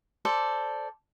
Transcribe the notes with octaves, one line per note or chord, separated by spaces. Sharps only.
A4 C5 D5